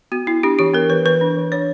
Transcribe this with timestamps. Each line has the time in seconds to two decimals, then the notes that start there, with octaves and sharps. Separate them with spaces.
0.12 B3 F#4
0.27 B3 E4
0.43 D4 G4
0.59 E3 G4
0.74 B3 A#4
0.89 E3 B4
1.05 E3 B4
1.21 D4
1.36 E3
1.52 D4 C#5